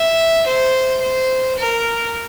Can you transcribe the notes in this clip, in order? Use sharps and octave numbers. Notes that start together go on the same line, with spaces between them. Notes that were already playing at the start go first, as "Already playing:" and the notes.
Already playing: E5
C5
C5
A#4